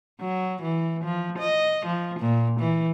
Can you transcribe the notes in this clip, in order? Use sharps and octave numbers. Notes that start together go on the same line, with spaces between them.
F#3
E3
F3
D#5
F3
A#2
E3